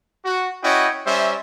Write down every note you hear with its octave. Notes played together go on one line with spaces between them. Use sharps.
F#4
C#4 E4 F#4 C#5 D#5 G5
G3 C#4 C5 E5